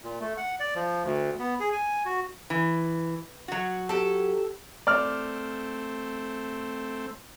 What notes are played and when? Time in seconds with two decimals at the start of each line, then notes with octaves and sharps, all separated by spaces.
0.04 A#2
0.20 A3
0.37 F#5
0.60 D5
0.75 F3
1.03 D2
1.39 B3
1.60 G#4
1.73 G#5
2.05 F#4
2.50 E3
3.48 F#3 F#4
3.89 G4 A4
4.87 A3 C4 D5 F6